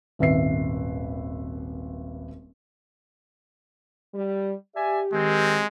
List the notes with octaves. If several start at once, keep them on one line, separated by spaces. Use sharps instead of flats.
D#1 G#1 B4 E5 C7
G3
G4 D5 E5 G#5
D#3 G#3 C4